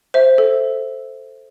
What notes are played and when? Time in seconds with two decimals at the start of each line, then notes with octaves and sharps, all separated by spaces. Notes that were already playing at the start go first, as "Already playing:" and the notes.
0.14 C5 E5
0.38 A4